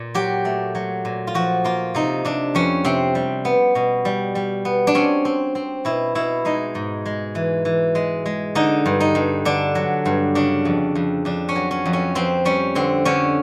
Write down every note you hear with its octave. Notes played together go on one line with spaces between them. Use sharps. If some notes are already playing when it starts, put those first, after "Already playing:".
Already playing: A#2
F#3 G4
A3
F#3
A#2
F4
F3 F#4
A#3 F4
C3 D#4
C3 D4
F2 C#4
C3 C4
G3
B3
B2
G3
G3
B3
D4
C4 C#4
C4
C4
B2 E4
B2 E4
G#3 D#4
G#2
G#3
E3
E3
G#3
G#3
D3 D#4
G2
D#4
G2
D3 D4
F#3
G2
C#3 D4
F2
F2
F2 D4
C#4
F#3
C#4
F2
C#4
F2 C4
G3 C#4
D3 C4
D3 C#4